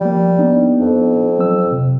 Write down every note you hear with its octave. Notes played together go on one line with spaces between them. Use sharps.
F3 G3 A#3
B3 D4 D#4
F2
F#3 C4 E6
C3